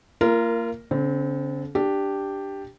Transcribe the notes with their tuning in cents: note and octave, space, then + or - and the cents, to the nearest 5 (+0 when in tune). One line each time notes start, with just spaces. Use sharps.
A#3 -20 F4 -35 A#4 +0
D3 -45 C4 +0
D4 +0 G4 +0